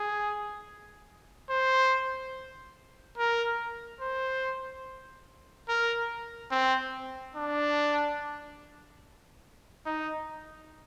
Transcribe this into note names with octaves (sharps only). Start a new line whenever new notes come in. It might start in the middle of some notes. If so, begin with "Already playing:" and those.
Already playing: G#4
C5
A#4
C5
A#4
C4
D4
D#4